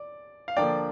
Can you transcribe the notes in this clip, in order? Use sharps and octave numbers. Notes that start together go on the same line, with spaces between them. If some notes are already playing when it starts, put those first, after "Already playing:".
Already playing: D5
F5
D3 F3 A#3 D4 D5 G5